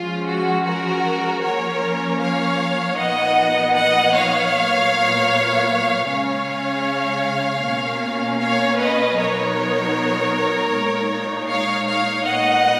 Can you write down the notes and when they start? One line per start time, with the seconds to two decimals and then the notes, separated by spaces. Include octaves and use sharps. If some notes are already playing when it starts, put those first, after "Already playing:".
Already playing: F3 G#3 C#4 F4
0.27 F#4
0.65 F#4 A#4
1.43 F3 A#3 C#4 A#4 C#5
2.20 C#5 F5
2.97 A#2 F3 B3 D#4 D#5 F#5
3.75 D#5 F#5
4.13 C#5 F5
4.52 A#2 F#3 B3
6.06 C#3 G#3 C#4 C#5 F5
7.61 B2 A#3 C#4
8.39 C#5 F5
8.77 B4 D#5
9.16 B2 F#3 B3 D#4 A#4 C#5
10.71 A#2 G#3 D#4
11.48 C#5 F5
11.87 C#5 F5
12.26 A#2 G#3 B3 D#4 D#5 F#5